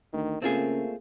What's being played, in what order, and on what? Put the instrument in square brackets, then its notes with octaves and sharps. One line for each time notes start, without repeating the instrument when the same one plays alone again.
[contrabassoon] D2 [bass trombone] D#3
[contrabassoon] C#3 [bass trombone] A3 [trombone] A#3 [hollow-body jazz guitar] C4 F4 G#4